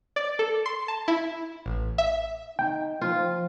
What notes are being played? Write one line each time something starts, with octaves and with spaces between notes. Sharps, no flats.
D5
A4
C6
A5
E4
A1
E5
D#4 G5
F3 F4